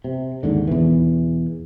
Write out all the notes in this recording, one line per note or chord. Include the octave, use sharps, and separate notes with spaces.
C3
D#2 G#2 D3
E2 B2 E3